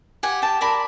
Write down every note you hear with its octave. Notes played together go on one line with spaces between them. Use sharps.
G4 F#5 G#5
G5 A5
A#4 D5 A5 B5